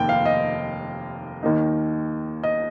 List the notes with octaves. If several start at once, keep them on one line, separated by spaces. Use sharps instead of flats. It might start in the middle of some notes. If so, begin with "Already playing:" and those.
Already playing: F1 D#2 D#3 A#3 G5
F5
D#5
D#2 D#3 A#3 D#4
D#5